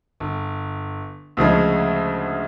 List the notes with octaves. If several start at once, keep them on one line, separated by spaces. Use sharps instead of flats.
G1
D2 C#3 F3 G#3